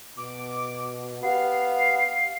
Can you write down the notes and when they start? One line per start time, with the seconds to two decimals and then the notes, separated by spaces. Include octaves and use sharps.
0.17 B2 D6
1.23 B3 G4 F5 C7